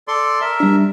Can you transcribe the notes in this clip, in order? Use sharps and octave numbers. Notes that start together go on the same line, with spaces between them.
A4 D5 C6
A#4 E5
G3 D4